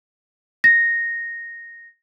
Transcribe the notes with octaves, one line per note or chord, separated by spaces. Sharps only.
A#6